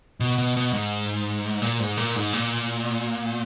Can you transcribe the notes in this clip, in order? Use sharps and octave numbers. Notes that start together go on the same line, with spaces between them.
B2
B2
B2
G#2
A#2
G#2
A#2
G#2
A#2